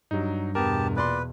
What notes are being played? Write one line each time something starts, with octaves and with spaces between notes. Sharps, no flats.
G2 F#3 D#4
E2 B2 B3 G4 A#4 A5
A#2 B4 D5 C6